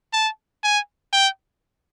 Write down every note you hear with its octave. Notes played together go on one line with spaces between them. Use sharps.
A5
G#5
G5